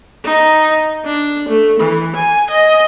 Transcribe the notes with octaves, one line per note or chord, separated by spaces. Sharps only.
D#4
D4
A3
E3
G#5
D#5